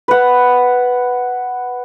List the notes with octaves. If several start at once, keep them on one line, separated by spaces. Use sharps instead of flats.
B4 F#5